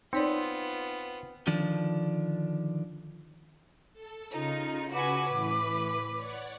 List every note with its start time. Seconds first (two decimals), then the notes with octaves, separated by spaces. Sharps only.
0.13 B3 C4 D#4 F4 C#5 D5
1.47 D3 D#3 F3 D4
3.93 A4
4.33 C#3 D#4 F4
4.93 F#4 B4 G#5 D6
5.27 A2 E3 B4
6.16 C#5 D5 F#5